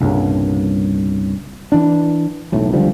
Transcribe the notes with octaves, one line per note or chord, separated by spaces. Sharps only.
C2 G2 A#2 C#3
E3 D4
E1 B1 A2
C#2 D3 F3 G3